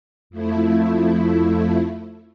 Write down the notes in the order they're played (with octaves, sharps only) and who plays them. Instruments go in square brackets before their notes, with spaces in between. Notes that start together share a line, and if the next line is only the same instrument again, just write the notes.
[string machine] F2 F3 A3 E4